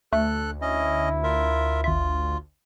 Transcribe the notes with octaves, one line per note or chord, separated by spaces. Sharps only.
D2 A3 A4 F#6
C#4 E4 D#5
F4 A#4 E5
G#1 F4 E5